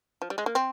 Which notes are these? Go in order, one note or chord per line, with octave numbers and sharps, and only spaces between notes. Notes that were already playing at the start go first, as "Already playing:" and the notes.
F3
G3
G#3
A#3
C4